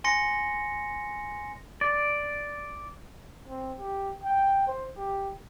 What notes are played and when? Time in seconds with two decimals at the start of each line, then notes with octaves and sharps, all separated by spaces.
0.04 G#5 C6 A#6 C#7
1.81 D5
3.48 C4
3.78 G4
4.24 G5
4.67 C5
4.97 G4